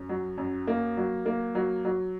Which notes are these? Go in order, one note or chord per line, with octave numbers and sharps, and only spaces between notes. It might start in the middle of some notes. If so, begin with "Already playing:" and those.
Already playing: F#2
F#3
F#2
A#3
F#3
A#3
F#3
F#3